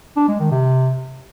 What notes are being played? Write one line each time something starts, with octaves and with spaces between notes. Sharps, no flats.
D4
G#3
D#3
C3